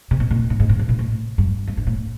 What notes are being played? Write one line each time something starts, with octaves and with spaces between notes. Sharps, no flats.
C3
B2
A#2
A2
G#2
A2
A#2
B2
A2
G2
G2
G#2
A2